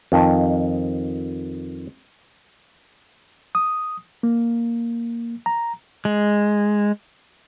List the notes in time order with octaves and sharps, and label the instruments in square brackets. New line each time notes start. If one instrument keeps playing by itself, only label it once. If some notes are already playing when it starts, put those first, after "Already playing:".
[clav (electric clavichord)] F2 D#3
[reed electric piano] D#6
A#3
A#5
[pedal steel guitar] G#3